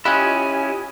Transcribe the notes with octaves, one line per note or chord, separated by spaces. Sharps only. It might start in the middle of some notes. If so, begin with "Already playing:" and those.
C#4 E4 F4 G4 D#5 G#5 B5 F#6